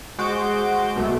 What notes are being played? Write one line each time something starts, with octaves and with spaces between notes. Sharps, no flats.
G#3 F#4 C5 D6 G6 D7
C2 B2 A3